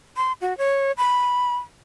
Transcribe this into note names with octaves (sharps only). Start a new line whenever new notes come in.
C6
F#4
C#5
B5